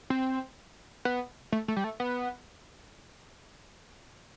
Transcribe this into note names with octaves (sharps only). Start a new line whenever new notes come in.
C4
B3
A3
A3
G3
A3
B3